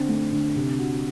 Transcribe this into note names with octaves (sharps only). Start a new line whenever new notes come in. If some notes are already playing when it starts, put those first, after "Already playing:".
Already playing: D3 C4
A3
D3
C3
F#4